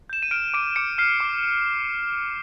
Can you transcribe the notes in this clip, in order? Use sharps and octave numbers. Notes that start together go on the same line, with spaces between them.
G6 E7
D#7
F6 D7
D6 D7
D6 C#7
F6 C7
D6